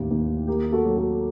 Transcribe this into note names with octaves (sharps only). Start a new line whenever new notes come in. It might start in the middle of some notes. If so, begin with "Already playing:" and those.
Already playing: A1 D#2 G4
D#2
A#3 G4
F#4 A4
F#3
F#4 A4